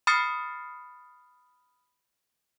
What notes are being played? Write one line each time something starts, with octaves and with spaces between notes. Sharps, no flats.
B5 D#6 F6 A6 C7 C#7